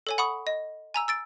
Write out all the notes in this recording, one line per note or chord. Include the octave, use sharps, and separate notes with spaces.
A4 C#5 G#5
F#5 B5 C#6 D#6
D#5
G#5 A#5 E6
E6 A6 D7